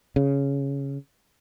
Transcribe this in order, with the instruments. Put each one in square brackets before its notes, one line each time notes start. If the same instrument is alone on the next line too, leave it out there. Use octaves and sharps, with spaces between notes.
[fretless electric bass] C#3